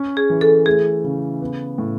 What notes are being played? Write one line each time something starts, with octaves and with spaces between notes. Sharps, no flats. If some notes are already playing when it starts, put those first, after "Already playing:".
Already playing: C#4
G#4
E3
A4
A3 G#4
C#3
B3
A2